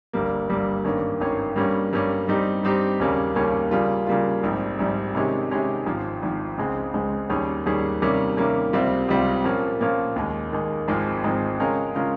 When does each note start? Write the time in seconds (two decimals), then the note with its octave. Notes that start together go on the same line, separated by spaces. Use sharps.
0.13 G1 G2 G3 A#3
0.49 G1 G2 G3 A#3
0.84 G#1 G2 D#3 A#3 C#4
1.20 G#1 G2 D#3 A#3 C#4
1.56 G2 G3 A#3 C#4
1.93 G2 G3 A#3 C#4
2.27 G2 G3 C4 D#4 G4
2.63 G2 G3 C4 D#4 G4
2.99 D#2 C#3 G3 A#3 C#4
3.35 D#2 C#3 G3 A#3 C#4
3.71 C#3 G3 A#3 F4
4.07 C#3 G3 A#3 F4
4.43 A#1 G#2 G3 C4
4.79 A#1 G#2 G3 C4
5.15 C3 D#3 G#3 C#4 G4
5.51 C3 D#3 G#3 C#4 G4
5.86 G#1 G#2 F3
6.22 G#1 G#2 F3
6.57 C#2 C#3 G#3 C4
6.94 C#2 C#3 G#3 C4
7.29 D#2 D#3 G3 C#4 G#4
7.66 D#2 D#3 G3 C#4 G#4
8.02 C3 D#3 G3 A#3 C#4
8.37 C3 D#3 G3 A#3 C#4
8.73 C#2 C3 G3 C4 F4
9.08 C#2 C3 G3 C4 F4
9.44 A#2 F3 A#3 C#4 F4
9.81 A#2 F3 A#3 C#4 F4
10.16 D#2 D#3 G#3
10.53 D#2 D#3 G#3
10.88 G#1 G#2 F3 G#3 C4
11.24 G#1 G#2 F3 G#3 C4
11.60 C#3 G#3 C#4 F4 A#4
11.95 C#3 G#3 C#4 F4 A#4